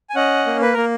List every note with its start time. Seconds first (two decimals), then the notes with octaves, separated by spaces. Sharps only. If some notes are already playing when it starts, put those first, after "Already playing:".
0.10 G#5
0.15 C#4 D#5 F#5
0.46 A#3
0.62 B4
0.73 A#3 A#4